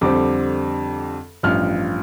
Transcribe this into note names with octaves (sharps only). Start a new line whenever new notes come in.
F2 D3 G3 C4 D6
A1 G2 F3 F6